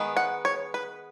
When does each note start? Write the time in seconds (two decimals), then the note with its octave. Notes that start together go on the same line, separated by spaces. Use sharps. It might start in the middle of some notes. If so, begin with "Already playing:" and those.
Already playing: D#3 G#3 B3
0.17 F#5
0.45 C#5
0.74 B4